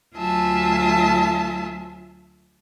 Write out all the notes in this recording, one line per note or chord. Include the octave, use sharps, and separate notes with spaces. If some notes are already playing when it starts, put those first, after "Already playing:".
D2 F#3 F4 E5 G#5 A5